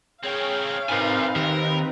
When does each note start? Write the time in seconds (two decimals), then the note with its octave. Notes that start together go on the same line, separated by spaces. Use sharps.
0.23 C4 G#4 A#4 C#5 F5 G5
0.89 G2 C3 C4 D#4 A#4 B4 G#5
1.36 D#3 G4 A#4